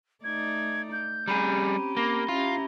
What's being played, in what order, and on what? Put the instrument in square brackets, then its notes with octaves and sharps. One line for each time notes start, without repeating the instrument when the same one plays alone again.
[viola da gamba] A3 D#4 D5 [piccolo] G#6
[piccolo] G6
[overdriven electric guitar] G3 G#4 [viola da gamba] C4 C#4 G4 [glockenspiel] A#5 B5 D#7
[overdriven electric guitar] A#3 [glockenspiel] B5 A#6 G7 [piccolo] D6
[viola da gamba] C#4 E4 G4 [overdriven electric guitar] F4 [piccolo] A#5